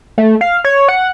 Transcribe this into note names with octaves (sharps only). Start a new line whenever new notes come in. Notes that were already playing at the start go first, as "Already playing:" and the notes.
A3
F5
C#5
F#5